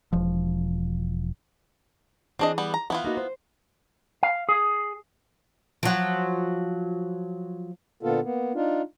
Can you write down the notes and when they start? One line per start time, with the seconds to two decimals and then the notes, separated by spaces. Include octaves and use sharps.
0.12 E1 F3
2.39 E3 C4 D4 G#4 D#5
2.58 G3 B3
2.74 A#5
2.90 E3 B3 E4 F4 B4
3.04 A#3 D#4 F#4
3.17 C5
4.23 F5
4.49 G#4
5.83 F3 F#3
8.03 A#2 D3 A#3 B3 F4 A4
8.23 A#3 B3
8.54 D4 D#4 F4